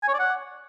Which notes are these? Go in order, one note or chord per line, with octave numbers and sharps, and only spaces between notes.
G#5
C#5
D5
F#5